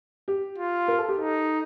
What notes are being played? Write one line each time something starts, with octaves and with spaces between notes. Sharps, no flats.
G4
F4
A#4
A4
G4
D#4 A4